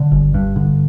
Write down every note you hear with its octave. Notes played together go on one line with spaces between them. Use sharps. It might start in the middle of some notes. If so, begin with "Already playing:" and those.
Already playing: D3
G1
G2
D3